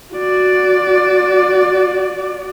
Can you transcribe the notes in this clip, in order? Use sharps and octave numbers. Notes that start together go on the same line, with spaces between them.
F#4 D5